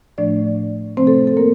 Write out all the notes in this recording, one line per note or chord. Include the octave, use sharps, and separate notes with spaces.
A2 F3 A3 D4 D5
C3 F3 A3 C4 C5
A4
A4
A#3 A#4